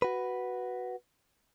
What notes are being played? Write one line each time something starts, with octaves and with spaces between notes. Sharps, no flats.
F#4 B4